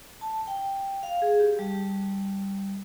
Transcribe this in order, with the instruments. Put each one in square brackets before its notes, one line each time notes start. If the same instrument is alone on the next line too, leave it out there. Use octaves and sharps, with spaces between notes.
[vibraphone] A5
G5
F5
G#4
G4
G3